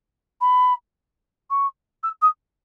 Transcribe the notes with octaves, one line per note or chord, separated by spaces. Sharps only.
B5
C#6
E6
D#6